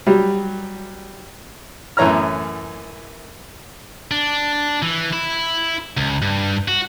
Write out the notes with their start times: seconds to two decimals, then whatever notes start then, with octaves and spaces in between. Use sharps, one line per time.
0.07 F#3 G3
1.97 F#2 A2 E3 C#5 A#5 F6
4.11 D4
4.82 E3
5.13 E4
5.97 C#2
6.22 G2
6.68 F#4